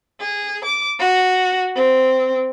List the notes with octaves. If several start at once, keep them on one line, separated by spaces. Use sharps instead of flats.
G#4
D6
F#4
C4